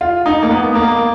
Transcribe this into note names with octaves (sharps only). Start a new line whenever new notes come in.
F4
D#4
A#3
B3
A#3